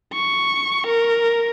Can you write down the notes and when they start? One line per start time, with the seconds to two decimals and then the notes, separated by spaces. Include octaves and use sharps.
0.13 C#6
0.87 A#4